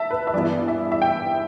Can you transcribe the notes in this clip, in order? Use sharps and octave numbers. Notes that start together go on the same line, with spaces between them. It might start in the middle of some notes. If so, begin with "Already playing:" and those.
Already playing: E5 A5
B4
E5
G2 E3 B3 E4 D5
E5
E5
G5